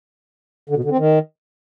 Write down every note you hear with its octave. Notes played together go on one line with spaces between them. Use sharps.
D3
B2
D3
C4
D#3